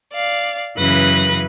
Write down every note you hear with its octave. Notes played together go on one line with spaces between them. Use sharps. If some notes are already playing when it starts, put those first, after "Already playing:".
D5 F5
F#2 C#3 E3 B4 F#6 A#6